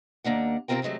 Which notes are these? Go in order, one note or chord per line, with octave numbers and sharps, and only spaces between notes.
D#2 A#3 D4 F#5
C3 C4 C#4 F4 A#4 G5
C3 D#3 F#3 G#3 A3